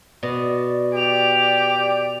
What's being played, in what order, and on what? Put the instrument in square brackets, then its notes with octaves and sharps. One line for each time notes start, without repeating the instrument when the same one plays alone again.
[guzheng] B2 [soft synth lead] D5
[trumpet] G4 [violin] D7 F7